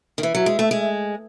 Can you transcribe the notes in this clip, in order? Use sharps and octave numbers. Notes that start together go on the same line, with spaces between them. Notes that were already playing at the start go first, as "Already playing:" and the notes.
D#3
E3 E5
F#3
G#3
A3
G#3